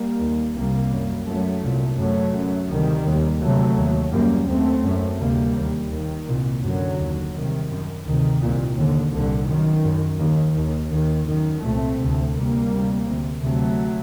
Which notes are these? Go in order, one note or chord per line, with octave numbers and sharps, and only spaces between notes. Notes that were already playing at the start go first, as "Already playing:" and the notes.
Already playing: G3 A#3
D#2
C2 C3 G3 A#3
F#2
F#2 F#3 A3
C2 A#2
F#2 F#3 A3
F#2
D2 C3 D#3 G3
D#2
D2 C3 F#3 A3
D#2
F#2 G3 A#3
D#2 A3 C4
F#2
D2 C3 G3 A#3
D#2
D#2 D#3
C2 A#2
F#2 D3 F#3
D#2
C2 C3 D#3
F#2
D2 C3 D#3
C2 A#2
D#2 D3
C2 A#2 D3
F#2 D#3
F#2
D#2 D#3
D#2
D#2 D#3
F#2 D#3
C2 A#2 A3 C4
D2 C3
D2 C3 G3 A#3
D2 C3
D2 C3
D2 C3 F#3 A3